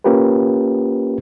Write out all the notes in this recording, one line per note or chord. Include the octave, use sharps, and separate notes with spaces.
A#3 C#4 F4 G4 A#4 B4